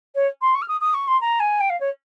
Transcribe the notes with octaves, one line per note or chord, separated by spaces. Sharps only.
C#5
C6
C#6
F6
D#6
D#6
C#6
C6
A#5
G#5
G5
F5
C#5